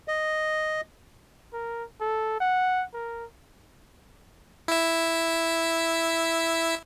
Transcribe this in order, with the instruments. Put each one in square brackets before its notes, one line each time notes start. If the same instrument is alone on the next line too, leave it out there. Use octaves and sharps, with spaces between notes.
[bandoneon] D#5
[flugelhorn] A#4
A4
F#5
A#4
[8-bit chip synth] E4 E5